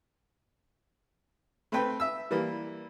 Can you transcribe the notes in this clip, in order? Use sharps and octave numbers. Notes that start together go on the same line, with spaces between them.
A3 C4 B4 G5
E5 E6
E3 G3 A#3 E4